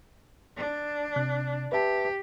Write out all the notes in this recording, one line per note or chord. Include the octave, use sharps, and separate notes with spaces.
D4
C3 F#6
G4 B4 E5 A5